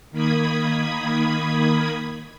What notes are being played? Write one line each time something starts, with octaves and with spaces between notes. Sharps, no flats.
D#3 A#3 B5 D#6 G#6